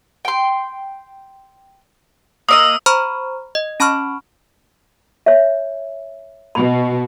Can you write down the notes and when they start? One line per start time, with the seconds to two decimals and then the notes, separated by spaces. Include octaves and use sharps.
0.25 G5 C6
2.49 A#3 D5 D#5 D#6 E6
2.86 C5 A#5 B5 C#6 F6
3.55 D#5
3.80 C#4 A5 B5 C#6 F6
5.26 C#5 E5
6.55 B2 B5